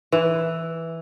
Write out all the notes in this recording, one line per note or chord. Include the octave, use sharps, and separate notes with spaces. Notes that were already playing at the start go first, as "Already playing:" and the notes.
E3